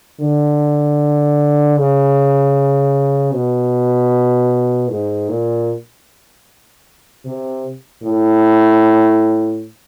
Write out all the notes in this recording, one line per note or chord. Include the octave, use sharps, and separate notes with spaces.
D3
C#3
B2
G#2
A#2
C3
A2